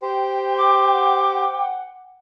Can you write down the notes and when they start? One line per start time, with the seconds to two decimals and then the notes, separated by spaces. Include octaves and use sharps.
0.02 G4 C5 G5
0.57 D6
0.93 F#5